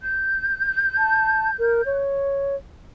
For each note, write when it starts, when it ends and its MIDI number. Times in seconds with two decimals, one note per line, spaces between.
0.01 1.97 91
0.97 1.50 81
1.59 1.82 70
1.86 2.56 73